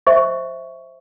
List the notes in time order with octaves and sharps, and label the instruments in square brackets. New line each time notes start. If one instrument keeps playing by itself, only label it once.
[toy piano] C5 D#5 E5 C#6